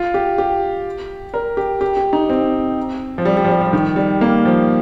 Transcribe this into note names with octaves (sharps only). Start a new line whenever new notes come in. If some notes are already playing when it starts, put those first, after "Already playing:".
Already playing: F4
G4
G4
A#4
G4
G4
G4
D#4
C4
F3
G3
G3
F3
G3
F3
D#3
G3
A#3
F3